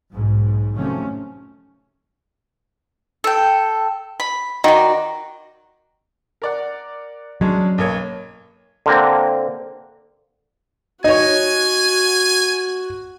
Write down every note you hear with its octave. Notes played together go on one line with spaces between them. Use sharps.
B1 G#2
C3 D#3 F3 F#3 A3 C#4
A4 G5
B5
D#3 F#4 D5
A#4 D5 F#5
F#3 G#3 C#4 D4
B1 A#3 C#5
D3 A#3 C4
D#4 F#4 C#5 G#5